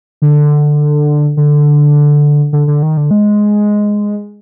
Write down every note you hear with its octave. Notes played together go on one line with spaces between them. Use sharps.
D3
D3
D3
D3
D#3
D3
G#3